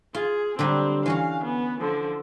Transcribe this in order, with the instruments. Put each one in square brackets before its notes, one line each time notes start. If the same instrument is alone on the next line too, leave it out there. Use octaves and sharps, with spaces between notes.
[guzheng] F4 [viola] G#4
[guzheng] D3 F#3 G3 [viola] C4
[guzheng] E3 C#4 F#4 [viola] F5
[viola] B3
D3 F3